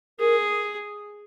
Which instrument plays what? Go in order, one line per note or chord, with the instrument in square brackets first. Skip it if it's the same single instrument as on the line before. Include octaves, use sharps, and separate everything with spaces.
[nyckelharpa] G#4 [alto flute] A#4